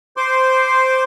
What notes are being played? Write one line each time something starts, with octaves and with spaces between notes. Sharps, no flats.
C5 C6 D6